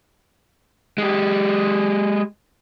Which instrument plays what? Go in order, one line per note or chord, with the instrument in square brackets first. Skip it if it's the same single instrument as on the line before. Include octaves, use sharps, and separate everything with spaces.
[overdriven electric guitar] G#3 G4